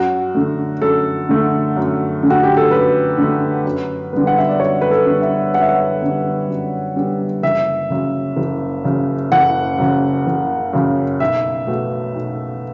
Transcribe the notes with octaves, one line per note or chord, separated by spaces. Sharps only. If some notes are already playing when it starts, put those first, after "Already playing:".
Already playing: F#2 F#4
D3 A3
F#2 A4
D3 A3
F#2
D3 A3
F#4
G4
A4
F#2 B4
D3 A3
F#2
D3 G3 B3
F#5
E5
D5
F#2 C#5
B4
A4
D3 G3 B3
E5
F#2 F#5
E5
F#5
D3 G3 B3
F#2
D3 G3 B3
F#1 E5
F#2 C#3
F#1
F#2 C#3
F#1 F#5
F#2 C#3
F#1
F#2 C#3
B1 E5
B2 A3
B1